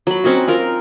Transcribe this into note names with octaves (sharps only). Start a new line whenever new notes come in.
F#3 B5
C4 C#4 D#4 F#4
C4 F4 A#4